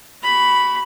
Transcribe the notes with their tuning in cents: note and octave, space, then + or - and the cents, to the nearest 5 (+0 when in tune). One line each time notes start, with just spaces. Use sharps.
F#4 +35 B5 +0